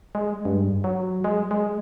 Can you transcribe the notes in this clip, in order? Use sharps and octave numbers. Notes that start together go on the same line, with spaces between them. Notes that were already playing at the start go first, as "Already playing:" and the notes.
G#3
G2
F#3
G#3
G#3